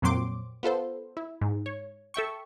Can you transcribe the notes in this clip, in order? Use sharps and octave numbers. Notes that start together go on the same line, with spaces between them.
F2 A#2 F#3 C4 C6 D6
B3 F4 A4 C5
E4
G#2
C#5
A4 E5 G5 C#6